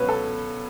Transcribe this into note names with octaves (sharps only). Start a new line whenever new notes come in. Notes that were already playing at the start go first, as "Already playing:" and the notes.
Already playing: C#2 B2 F#3 B4 C#5
A4